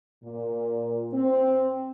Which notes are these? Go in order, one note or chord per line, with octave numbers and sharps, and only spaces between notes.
A#2
C4